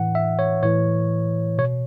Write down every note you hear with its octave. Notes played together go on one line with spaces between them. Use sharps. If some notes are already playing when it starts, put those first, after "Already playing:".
Already playing: A2 E3 F#5
E5
C#5
A2 E3 C#5
B2 C#5